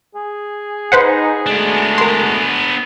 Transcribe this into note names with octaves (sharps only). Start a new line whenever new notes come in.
G#4
D#4 B4 C5 F#5
G#3 A3 B3 D4 F#4
A#4 C6